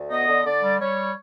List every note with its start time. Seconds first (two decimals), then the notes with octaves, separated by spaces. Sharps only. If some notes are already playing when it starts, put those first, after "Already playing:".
Already playing: D2
0.11 B3 D#5
0.28 D3
0.45 D3 D5
0.63 G3
0.80 G3 C#5